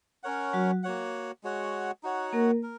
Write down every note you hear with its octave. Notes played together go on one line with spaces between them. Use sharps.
C#4 A#4 C#5 F#5
F#3 F#4
A#3 F#4 C#5 F#5
G#3 F#4 C#5 F#5
D#4 F#4 C#5 F#5
A#3 A#4
A#4